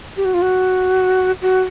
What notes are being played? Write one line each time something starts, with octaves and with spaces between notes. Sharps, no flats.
G4
F#4
F4
F#4
F#4